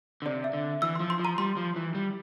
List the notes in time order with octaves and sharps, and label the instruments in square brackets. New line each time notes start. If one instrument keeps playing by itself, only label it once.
[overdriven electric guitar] D3
[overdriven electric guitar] C3 [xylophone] D5
[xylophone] E5
[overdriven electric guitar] D3
[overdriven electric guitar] E3 [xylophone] E6
[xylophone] C6
[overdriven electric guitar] F3
[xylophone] C6
[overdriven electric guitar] F3
[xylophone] A#5
[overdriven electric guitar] G3 [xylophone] C6
[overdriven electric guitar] F3
E3
G3